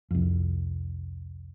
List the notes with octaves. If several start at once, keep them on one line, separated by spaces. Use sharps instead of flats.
C2 F2